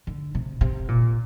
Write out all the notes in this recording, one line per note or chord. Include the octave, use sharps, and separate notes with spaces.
D3
C3
C3
A#2